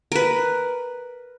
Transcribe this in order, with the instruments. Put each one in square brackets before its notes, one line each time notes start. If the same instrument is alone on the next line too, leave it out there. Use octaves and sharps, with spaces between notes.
[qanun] A#4 B4